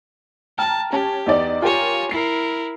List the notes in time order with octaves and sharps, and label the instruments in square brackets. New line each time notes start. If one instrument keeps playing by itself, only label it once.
[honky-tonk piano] G5 A#5 F6 [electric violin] A5
[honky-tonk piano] C#4 A5 [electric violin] G4
[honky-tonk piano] E2 D#4 D5
[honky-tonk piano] F4 G4 A#4 [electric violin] C#5 G#5
[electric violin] E4 A#4 [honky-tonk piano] C7